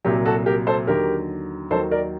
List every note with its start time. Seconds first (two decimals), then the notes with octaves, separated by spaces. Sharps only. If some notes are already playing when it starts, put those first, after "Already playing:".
0.05 C2 A#2 F#3 G4
0.25 F#4 A4
0.46 G4 A#4
0.67 A4 C5
0.87 D#2 D3 F#3 G4 A#4
1.70 D#2 D#3 F#3 A4 C5
1.91 A#4 D5